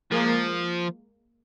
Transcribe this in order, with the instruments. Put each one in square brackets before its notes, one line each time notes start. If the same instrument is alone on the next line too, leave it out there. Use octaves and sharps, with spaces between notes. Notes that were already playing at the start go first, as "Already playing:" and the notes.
[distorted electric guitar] F3 [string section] G#3 A#3